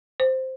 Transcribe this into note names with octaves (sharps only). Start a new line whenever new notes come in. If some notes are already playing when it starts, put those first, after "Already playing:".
C5